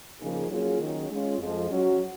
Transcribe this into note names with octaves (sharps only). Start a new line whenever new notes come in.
C#3 F3 A#3 D#4 G#4
F#3 A#3 C#4 F4 G#4
D#3 F#3 C#4 G#4
G#3 C#4 F4
F2 F3 G#3
F#3 C#4 F#4